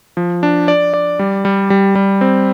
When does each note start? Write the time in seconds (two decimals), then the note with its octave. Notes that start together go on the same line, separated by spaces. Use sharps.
0.17 F3
0.43 D4
0.68 D5
0.94 D5
1.19 G3
1.45 G3
1.70 G3
1.95 G3
2.21 C4